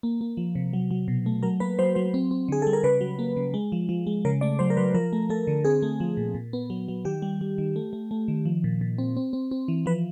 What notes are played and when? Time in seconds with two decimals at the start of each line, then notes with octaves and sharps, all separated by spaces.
0.03 A#3
0.21 A#3
0.37 F3
0.55 C3
0.73 F#3
0.91 F#3
1.08 B2
1.26 A3
1.43 F#3 A#4
1.60 A#3 B4
1.79 F#3 C5
1.95 F#3 C5
2.14 C4
2.31 C4
2.48 D3 G#4
2.62 G3 A4
2.73 A#4
2.84 C#3 B4
3.01 F#3
3.19 A#3
3.37 C#3
3.54 G#3
3.72 F3
3.89 F3
4.07 G#3
4.25 C#3 A#4
4.41 A3 D5
4.59 F#3 C5
4.70 A#4
4.77 F#3 B4
4.94 F3 A#4
5.13 A3
5.29 A3 A4
5.47 D3
5.64 C4 G#4
5.82 A3
6.00 F3
6.17 A#2
6.34 A#2
6.53 B3
6.70 F#3
6.88 F#3
7.05 D#3 G4
7.22 G3
7.41 G3
7.58 D#3
7.76 A3
7.93 A3
8.11 A3
8.28 D#3
8.46 F3
8.64 A#2
8.81 A#2
8.98 C4
9.17 C4
9.33 C4
9.51 C4
9.68 E3
9.86 F3 B4